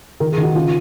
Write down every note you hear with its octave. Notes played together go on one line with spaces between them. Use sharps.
D#3 A#4
G#4
D#3
F#4
C#3 F4